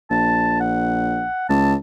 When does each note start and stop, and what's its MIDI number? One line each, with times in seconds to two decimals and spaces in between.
0.11 1.27 34
0.11 0.57 81
0.60 1.45 78
1.49 1.75 37
1.49 1.74 81